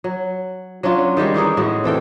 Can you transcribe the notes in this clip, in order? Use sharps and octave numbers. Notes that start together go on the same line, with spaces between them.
F#3
F#3 C#4 D4 F4
D#3 G3 G#3 G4
D#3 E3 D#4 G#4
A2 G#3 F#4
C3 E3 A4 G5